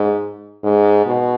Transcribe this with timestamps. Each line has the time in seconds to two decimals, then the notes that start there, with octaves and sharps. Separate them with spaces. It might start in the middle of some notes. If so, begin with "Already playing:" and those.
Already playing: G#2
0.64 G#2
1.06 B2